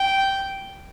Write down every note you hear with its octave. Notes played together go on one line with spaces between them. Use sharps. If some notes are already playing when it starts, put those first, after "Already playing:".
Already playing: G5